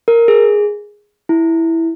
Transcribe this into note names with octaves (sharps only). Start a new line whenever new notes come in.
A#4
G#4
E4